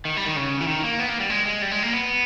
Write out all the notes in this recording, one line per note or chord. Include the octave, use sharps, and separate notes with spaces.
D#3
G3
D#3
C#3
E3
D#3
A#3
B3
A#3
G3
G#3
G#3
G3
G#3
A#3
B3